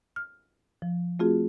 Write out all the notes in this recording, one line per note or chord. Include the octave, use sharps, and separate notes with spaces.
F6
F3
A3 C4 F4 F#4 G#4